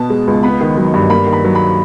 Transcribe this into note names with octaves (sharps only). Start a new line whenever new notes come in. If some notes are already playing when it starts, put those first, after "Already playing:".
Already playing: B2 B3 A5
G#3
C#2
B3 B5
D#3
F#3
G2
A#3 B5
D#3
B5
F#3
B5